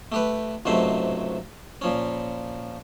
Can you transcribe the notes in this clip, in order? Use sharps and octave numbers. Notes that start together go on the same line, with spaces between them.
A3 G4 B4
C#2 G#2 C3 F#3 A3 C5
A#2 F3 C#4